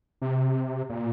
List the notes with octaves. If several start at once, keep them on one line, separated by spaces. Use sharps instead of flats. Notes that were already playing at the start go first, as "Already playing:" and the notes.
C3
A#2